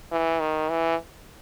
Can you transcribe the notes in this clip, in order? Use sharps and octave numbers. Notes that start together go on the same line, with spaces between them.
E3
D#3
E3